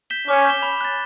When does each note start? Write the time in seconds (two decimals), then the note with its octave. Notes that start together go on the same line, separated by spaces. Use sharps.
0.10 G6 B6 E7 G7
0.28 C#4 D6
0.45 G6 B6 E7 G7
0.62 B5
0.81 F#6 A6